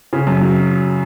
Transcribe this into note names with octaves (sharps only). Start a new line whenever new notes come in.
C#3
F#2
F#3